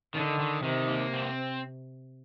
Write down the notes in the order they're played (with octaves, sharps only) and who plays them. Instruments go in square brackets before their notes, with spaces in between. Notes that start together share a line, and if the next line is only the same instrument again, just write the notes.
[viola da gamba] D3 [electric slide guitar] D#3
[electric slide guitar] D#3
[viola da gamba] C3 [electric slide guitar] D#3
[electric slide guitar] A#3
C4